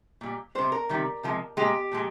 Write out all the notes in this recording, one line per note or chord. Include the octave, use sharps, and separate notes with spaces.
A#2 G3
C3 G3 C5
A#4
C3 D#3 G3
C3 F3 G#3
A#2 G#3 G4
A#2 F3 G#3